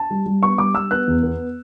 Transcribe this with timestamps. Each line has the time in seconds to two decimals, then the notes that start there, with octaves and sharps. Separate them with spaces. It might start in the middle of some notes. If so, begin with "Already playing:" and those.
Already playing: A5
0.10 G3
0.26 G3
0.43 B3 C#6
0.58 G3 D6
0.75 G3 E6
0.91 B3 F#6
1.07 E2
1.23 B3